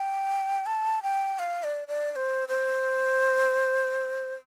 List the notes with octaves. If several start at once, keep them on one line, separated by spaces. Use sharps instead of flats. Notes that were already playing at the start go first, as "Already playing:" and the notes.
Already playing: G5
A5
G5
F5
D5
D5
D5
C5
C5